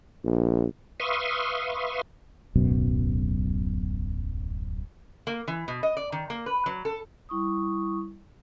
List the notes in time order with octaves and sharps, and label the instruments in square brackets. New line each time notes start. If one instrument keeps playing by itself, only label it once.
[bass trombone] A#1
[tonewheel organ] B4 E5 F5 C6 C#6 D#6
[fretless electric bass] D1 B1 F#2 B2
[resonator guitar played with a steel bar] A#3
E3
B2
D#5
D5
D#3
A#3
B4
F#3
A4
[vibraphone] G3 E4 C#6 D#6